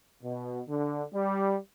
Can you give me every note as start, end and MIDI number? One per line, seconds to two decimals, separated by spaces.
0.23 0.61 47
0.68 1.03 50
1.14 1.57 55